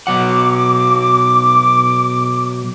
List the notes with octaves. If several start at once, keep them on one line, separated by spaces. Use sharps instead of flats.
B2 F#3 F#5 D6